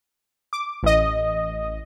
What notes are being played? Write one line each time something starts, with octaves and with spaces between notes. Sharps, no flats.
D6
A1 D#5